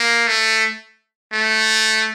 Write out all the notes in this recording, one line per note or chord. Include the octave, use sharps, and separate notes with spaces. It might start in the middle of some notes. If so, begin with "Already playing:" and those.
Already playing: A#3
A3
A3